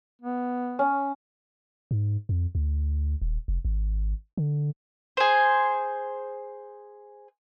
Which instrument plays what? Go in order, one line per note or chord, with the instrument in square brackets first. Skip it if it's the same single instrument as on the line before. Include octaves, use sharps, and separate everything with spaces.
[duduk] B3
[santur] C#4
[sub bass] G#2
F2
D2
D#1
F1
G#1
D3
[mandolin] G#4 C5